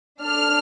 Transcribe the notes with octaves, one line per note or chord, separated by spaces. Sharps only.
D4 A4 F6